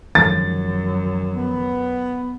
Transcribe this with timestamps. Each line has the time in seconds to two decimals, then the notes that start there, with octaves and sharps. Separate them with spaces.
0.15 F#2 D#3 F3 G#3 A6
1.35 B3